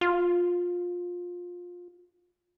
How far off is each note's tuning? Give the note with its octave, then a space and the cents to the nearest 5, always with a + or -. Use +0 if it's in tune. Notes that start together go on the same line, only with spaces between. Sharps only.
F4 +20